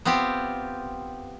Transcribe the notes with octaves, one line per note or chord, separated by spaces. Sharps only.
B3 C4 F4 G4